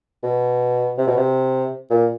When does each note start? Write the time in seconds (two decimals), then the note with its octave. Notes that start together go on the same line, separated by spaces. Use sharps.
0.23 B2
0.98 C3
1.07 B2
1.17 C3
1.91 A#2